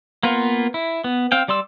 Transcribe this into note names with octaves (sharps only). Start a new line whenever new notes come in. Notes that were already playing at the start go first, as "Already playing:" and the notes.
A#3 B3 F4
E4
B3
C4 F5 G5
G3 D5 C6 E6